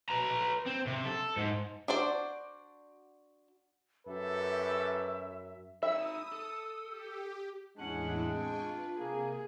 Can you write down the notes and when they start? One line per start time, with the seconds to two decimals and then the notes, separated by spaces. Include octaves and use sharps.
0.09 B4 A#5
0.67 C4
0.87 C3
1.06 A4
1.37 G#2
1.88 D4 F#4 C5 D5
4.07 F#2 G4 A4 B4 E5
5.83 D#4 E5 B5 D#6 E6
6.32 A4
6.87 G4
7.78 E2 A2 G#3 C#4 D4 E4 F#5
8.30 C4 G5 G#5 C#6
8.63 F4 B4
8.99 C3 A#3 G#4